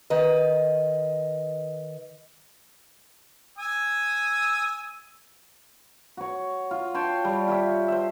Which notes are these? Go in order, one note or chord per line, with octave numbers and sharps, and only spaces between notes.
D#3 B4 D#5
G#5 D#6 E6
F#4 C#5
F4
C#5 G5 A5 C6
G3
F4 G4 C#5 E5
C5 E5